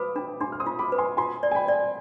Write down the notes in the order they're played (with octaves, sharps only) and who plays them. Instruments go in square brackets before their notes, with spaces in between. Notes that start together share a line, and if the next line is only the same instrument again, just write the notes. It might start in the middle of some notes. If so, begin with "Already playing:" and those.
Already playing: [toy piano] B4 [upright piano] B5 D6 D#6
[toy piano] D4 [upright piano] G5 B5
[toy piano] D4 [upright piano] G#5 C6
[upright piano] F6
C6 D#6
[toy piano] F4
[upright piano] B5 D6
[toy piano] B4
[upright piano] G#5 C6
[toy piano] F4 [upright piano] G#5 C6
[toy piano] D5
[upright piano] G#5
G5 B5
[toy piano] D5